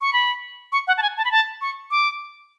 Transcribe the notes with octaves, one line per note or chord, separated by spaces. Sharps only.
C#6
B5
C#6
F#5
A5
G#5
A5
B5
A5
C#6
D6